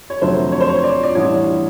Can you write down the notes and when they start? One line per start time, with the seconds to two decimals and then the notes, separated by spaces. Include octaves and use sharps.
0.10 C#5
0.21 F1 F2 D3 F#3 A3 C5
0.52 C#5
0.60 C5
0.69 C#5
0.84 D5
1.03 D5
1.15 A1 G2 E3 C#5